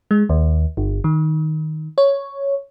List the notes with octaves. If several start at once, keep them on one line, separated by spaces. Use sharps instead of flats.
G#3
D#2
G1
D#3
C#5